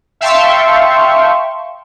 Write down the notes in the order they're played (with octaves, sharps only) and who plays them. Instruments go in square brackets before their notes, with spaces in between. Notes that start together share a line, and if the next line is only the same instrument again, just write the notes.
[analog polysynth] E5 F5 G5 A5 C6 C#6